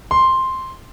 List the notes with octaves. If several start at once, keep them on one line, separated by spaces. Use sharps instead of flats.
C6